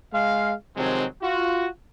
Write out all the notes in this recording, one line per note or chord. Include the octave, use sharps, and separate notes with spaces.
G#3 F5
C3 D#3 F3 F#3 G#3 C4
F4 F#4